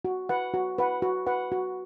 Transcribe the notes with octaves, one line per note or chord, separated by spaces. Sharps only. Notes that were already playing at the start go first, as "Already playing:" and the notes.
F#4
B4 F#5
F#4
B4 F#5
F#4
B4 F#5
F#4